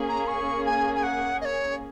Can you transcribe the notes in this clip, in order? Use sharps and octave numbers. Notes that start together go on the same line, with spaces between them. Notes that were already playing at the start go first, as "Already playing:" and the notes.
Already playing: A#3 C#4 G#4
A#5
C#6
G#5
G#5
F#5
D#5
C#5